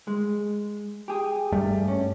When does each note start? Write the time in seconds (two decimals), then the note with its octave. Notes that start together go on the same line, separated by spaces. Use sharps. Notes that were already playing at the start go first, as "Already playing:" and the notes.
0.07 G#3
1.08 G4 G#4
1.52 G2 G3 A3
1.88 C#4